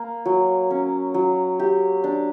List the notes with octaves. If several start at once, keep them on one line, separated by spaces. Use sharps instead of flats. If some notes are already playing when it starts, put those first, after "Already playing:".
Already playing: A#3
F#3
C#4
F#3
G4
D4